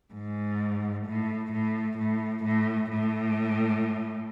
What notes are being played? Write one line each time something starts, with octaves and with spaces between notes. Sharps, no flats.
G#2
A2
A2
A2
A2
A2